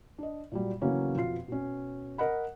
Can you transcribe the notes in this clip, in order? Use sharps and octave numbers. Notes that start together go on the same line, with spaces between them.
D4 D#5
A#2 F#3 G3
C#3 E3 F#3 A#3 B3 C#4
F2 B2 F4 C7
B2 C#4
A#4 D#5 F#5 B5